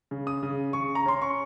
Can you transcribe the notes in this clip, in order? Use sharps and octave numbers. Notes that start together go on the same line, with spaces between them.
C#3
D#6
C#3
C#3 C#6
A#5
C#4 C6
C#6